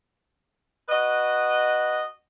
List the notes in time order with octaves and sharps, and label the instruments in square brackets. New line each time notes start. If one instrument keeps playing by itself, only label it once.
[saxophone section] F#4 B4 D#5